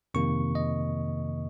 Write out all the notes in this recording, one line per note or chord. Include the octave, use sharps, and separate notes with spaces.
F2 C3 D#3 A#3 C#6
D#5